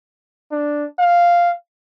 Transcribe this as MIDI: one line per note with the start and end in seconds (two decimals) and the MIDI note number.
0.51 0.85 62
0.99 1.50 77